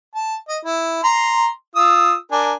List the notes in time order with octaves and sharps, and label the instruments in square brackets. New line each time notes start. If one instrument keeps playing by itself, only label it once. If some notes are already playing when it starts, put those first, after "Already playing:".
[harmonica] A5
D#5
E4
A#5 C6
F4 D#6 E6
D4 A#4 G#5